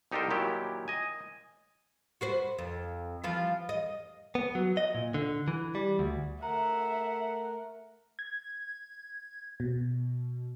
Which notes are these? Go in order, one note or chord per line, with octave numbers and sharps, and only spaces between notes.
C2 D#4 G4 A4 A#4 C5
A#2 D#3 F#3 E4 G4
D#5 G#5
F#4 B4 C5
F2
E3 F3 F4
D#5
B3
F#3
D#5
A#2
D3
E3
G3
D2
A3 A#4 E5 F#5 A#5
G#6
B2